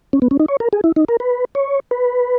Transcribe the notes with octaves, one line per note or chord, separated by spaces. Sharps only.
C#4
B3
C#4
D#4
C#5
A#4
G#4
E4
D#4
A#4
B4
C#5
B4